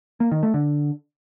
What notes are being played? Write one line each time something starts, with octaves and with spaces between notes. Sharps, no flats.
A#3
D#3
A3
D3